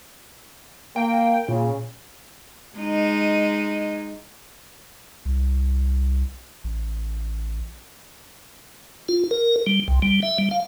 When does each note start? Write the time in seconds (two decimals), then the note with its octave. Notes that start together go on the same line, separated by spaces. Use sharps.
0.96 A#3 G5
1.48 A#2 C#3
2.78 G#3 D#4
5.25 C2
6.64 A1
9.09 F4
9.31 A#4
9.67 G3
9.88 C2
10.02 G3
10.23 E5
10.39 G3
10.51 F5